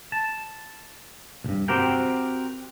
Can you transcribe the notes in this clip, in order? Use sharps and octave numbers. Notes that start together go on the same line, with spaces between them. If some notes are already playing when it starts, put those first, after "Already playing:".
A5
C2 G2
C4 F#4 G4 A#4 G5